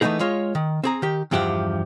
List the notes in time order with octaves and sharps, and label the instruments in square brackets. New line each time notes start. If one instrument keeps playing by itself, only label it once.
[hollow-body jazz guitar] E3 A3 B3 C4 D#4 G#4
G#3 F4 C#5
D#3
C4 G#4 A#5
D#3 G4
E2 G2 F3 G4 E5 F#5